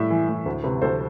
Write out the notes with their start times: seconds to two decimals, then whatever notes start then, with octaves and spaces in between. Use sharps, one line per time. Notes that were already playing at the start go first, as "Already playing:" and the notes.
Already playing: A2 G3 E5
0.10 E3
0.29 A2
0.46 D2
0.64 C3 B4
0.81 D2 A4 C5